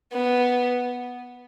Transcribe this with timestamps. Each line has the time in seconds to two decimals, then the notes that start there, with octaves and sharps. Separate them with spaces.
0.13 B3